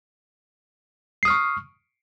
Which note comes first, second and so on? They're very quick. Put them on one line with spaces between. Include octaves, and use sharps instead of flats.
C7 D#6 F6 C#6